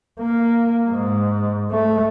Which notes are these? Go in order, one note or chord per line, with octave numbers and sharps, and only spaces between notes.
A#3
G#2
A3